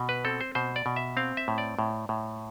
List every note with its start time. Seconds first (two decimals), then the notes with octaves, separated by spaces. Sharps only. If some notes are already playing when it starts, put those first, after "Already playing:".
Already playing: B2
0.09 B4
0.25 C4 A4
0.41 C5
0.55 B2 C5
0.76 D5
0.86 B2
0.96 E5
1.17 C4 F5
1.37 E5
1.48 A2
1.58 D5
1.79 A2
2.09 A2